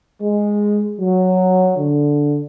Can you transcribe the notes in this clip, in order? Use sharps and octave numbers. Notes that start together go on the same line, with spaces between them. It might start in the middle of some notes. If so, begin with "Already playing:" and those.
G#3
F#3
D3